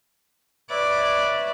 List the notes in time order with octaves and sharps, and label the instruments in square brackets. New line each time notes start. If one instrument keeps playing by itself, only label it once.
[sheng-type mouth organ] B4 C#5 E5 [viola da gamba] D5